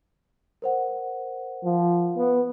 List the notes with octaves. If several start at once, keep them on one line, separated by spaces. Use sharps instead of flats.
A#4 C5 F#5
F3
B3